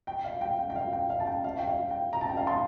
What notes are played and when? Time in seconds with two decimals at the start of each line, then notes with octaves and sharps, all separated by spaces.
0.07 G5
0.24 F5
0.41 G5
0.59 G5
0.70 G5
0.76 F5
0.93 G5
1.10 F5
1.20 A5
1.27 G5
1.44 F5
1.59 G5
1.67 F5
1.91 G5
2.13 A#5
2.21 A5
2.29 G5
2.37 F5 A5
2.47 A5 C6